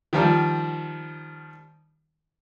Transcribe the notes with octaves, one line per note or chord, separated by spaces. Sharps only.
D#3 F3 G3